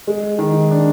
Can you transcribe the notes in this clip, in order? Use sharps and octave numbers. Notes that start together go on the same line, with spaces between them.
G#3
D#3
D4